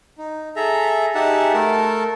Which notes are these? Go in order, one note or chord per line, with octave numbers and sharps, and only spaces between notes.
D#4
G#4 A4 E5 A#5
D#4 G4 G#4 E5 F#5 A5
A3 A4 A#4 A5